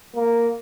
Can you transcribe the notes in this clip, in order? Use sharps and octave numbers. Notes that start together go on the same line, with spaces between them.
A#3